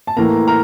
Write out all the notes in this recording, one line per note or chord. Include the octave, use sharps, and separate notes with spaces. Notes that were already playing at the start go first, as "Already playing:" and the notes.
A5
A2 E3 A#3 A#4 A#5
A#4 A#5